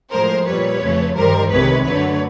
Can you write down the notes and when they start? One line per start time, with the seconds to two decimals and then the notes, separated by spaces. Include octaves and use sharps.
0.11 A2 F3 G#3 A#4 C5
0.46 A#2 G3 B4 C#5
0.80 F2 C#3 F3 A3
1.15 G2 D#3 G3 A#4 C5
1.50 C2 C3 D#3 G#3 B4 C#5
1.84 F#2 D3 F#3 A3 B4 C#5